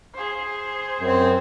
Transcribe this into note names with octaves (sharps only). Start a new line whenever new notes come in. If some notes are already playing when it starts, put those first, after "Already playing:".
G#4 C5
F#2 C4